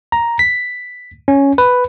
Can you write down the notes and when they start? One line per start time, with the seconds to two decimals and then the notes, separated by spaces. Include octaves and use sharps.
0.12 A#5
0.39 B6
1.28 C#4
1.58 B4